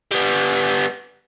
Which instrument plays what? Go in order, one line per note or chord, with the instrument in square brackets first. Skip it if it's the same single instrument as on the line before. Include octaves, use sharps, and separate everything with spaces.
[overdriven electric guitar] G3 B3